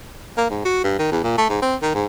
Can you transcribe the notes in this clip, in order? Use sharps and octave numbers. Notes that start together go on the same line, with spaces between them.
A#3
G#2
F#4
G2
D#3
E2
A#2
A3
G#2
C4
D#3
G#2